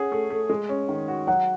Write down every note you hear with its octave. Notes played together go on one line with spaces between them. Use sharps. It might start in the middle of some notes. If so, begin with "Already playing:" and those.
Already playing: C#4 G#4 F#5
A3
A3
G#3
C#4
D#3
F#4
F#3 F#5